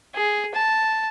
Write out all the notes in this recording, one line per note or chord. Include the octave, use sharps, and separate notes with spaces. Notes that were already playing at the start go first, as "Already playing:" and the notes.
G#4
A5